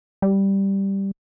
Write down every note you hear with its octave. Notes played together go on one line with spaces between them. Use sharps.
G3